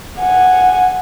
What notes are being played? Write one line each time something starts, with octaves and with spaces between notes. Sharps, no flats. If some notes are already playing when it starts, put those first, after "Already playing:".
F#5 G#5